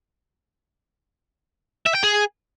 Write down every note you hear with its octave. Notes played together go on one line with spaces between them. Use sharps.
E5
G5
G#4